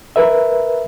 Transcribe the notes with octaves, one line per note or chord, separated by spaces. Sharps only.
A#4 B4 E5